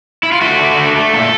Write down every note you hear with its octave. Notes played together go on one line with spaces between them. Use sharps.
E4
F4
A3 F#4
D3
A3
A3
A#2 A4